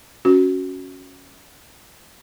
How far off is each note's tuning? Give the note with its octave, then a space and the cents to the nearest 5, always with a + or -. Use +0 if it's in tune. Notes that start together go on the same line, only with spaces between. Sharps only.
C#4 +0 F#4 +0